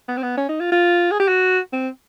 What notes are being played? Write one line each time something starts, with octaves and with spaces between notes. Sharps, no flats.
B3
C4
B3
C#4
D#4
F4
F4
G#4
G4
F#4
C4